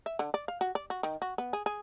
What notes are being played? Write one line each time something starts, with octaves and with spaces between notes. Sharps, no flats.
E5
D3
D5
F5
F#4
D5
F#4
D#3
F#4
B3
G#4
G#4